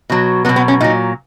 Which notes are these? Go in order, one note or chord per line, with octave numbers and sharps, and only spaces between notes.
B2 F#3
B2 F#3 B3
B3
C#4
A#2 F#3 D#4